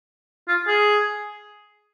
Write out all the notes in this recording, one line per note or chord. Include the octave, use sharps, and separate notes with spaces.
F4
G#4